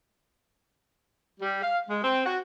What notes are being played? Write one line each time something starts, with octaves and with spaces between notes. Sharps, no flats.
G3
F5
G#3
C4
F#4